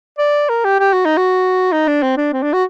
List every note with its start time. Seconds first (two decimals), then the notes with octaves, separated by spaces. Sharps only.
0.19 D5
0.49 A#4
0.64 G4
0.80 G4
0.93 F#4
1.05 D#4
1.17 F#4
1.72 D#4
1.87 D4
2.03 C4
2.17 D4
2.33 C4
2.43 D4
2.53 F#4